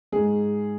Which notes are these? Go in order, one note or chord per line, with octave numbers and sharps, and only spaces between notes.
G#2 G#3 G#4